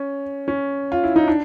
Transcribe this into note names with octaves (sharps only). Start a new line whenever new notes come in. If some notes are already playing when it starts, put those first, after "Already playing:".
Already playing: C#4
C#4
F4
E4
D#4
D4